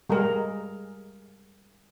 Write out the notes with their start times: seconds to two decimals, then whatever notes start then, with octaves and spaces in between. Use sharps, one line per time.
0.09 G3 G#3 G#4 A#4